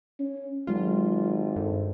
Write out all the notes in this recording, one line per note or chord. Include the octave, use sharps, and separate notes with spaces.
C#4
G#1 F#3 G#3 F4 G4
G2 A4 C5